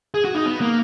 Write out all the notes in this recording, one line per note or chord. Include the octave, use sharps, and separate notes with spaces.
G#4
F#4
D#4
B3
A#3